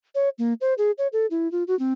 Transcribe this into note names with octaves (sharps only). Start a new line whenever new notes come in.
C#5
A#3
C5
G#4
C#5
A4
E4
F4
F#4
C4